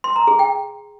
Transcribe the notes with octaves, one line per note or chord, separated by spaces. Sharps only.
C6
A#5
G#4
G5